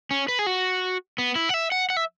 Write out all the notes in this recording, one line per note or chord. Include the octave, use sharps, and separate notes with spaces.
C#4
B4
G#4
F#4
B3
E4
F#5
E5
F#5
F#5
E5